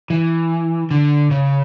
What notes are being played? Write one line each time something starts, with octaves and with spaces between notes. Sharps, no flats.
E3
D3
C#3